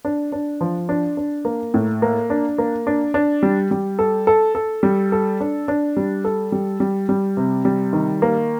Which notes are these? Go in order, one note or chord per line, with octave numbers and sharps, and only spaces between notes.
D4
D4
F3
D4
D4
A#3
A2
A#3
D4
A#3
D4
D4
G3
G3
A4
A4
A4
G3
A4
D4
D4
G3
A4
G3
G3
G3
C3
G3
D#3
A#3